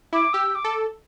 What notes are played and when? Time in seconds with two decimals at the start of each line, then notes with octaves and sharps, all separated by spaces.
0.13 E4 D6
0.33 G4 E6
0.55 D6
0.64 A4